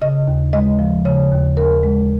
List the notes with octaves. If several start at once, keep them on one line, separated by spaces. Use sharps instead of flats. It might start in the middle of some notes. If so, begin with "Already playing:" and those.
C#3 D#5
D#2
G#3 D#5
F3
C#3 C#5
D#2
D#2 A#4
G#3